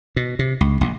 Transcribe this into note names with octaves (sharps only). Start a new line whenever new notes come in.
B2
C3
C#2
A#1